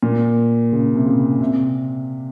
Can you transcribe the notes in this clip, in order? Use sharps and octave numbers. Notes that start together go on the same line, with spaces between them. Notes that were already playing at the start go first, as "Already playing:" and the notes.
A#2
C#3
C3
C#3
C3